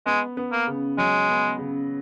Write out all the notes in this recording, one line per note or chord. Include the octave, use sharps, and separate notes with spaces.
G#3 B3
B3
A#3
C#3
F#3 G#3
B3
C#3